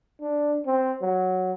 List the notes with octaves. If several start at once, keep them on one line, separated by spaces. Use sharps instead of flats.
D4
C4
F#3